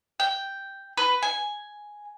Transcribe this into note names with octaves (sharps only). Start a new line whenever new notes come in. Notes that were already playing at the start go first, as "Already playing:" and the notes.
G5
B4
G#5